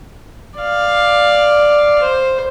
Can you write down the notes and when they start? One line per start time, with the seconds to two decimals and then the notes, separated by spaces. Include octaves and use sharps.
0.59 D5 F5
2.03 C5